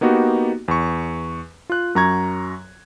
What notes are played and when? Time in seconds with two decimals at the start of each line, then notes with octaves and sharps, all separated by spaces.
0.01 A#3 B3 D#4 F#4 G4
0.68 E2 C#6
1.70 F4 F#6
1.95 F#2 F#3 A#5 C#6 G#6